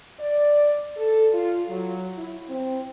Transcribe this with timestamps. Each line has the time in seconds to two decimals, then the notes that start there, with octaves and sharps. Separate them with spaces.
0.20 D5
0.97 A4
1.33 F4
1.69 F#3
2.18 E4
2.48 C4